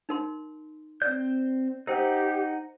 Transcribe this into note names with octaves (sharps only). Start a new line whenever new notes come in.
D#4 A#4 C6
C4 C5 D5 G6
D#4 G4 A#4 C5 F#5